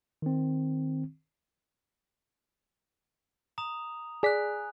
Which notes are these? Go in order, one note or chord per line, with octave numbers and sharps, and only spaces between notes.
D#3 C4
A#5 D#6 F7
G#4 D5 G#5 F#6 B6